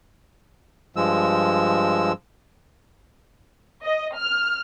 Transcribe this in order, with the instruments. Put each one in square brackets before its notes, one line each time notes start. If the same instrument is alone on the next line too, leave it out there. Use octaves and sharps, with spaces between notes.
[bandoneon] G2 F3 G#3 E6
[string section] D#5
F6